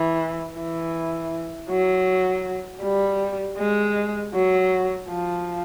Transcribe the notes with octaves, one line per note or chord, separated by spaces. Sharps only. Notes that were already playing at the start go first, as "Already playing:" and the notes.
Already playing: E3
E3
F#3
G3
G#3
F#3
F3